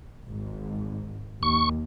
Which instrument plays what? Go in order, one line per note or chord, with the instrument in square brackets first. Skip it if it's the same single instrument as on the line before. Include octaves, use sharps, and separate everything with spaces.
[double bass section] G#1 G#2
[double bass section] D#2 [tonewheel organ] C#6